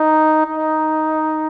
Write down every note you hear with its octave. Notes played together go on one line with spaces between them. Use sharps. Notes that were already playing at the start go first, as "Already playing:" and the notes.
Already playing: D#4
D#4